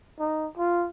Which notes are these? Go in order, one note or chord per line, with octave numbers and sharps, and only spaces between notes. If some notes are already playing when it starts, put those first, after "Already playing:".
D#4
F4